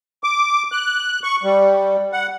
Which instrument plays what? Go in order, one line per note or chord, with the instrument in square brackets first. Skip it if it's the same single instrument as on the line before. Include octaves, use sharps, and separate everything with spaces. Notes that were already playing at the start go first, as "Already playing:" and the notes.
[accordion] D6
F#6
C#6
G3
F#5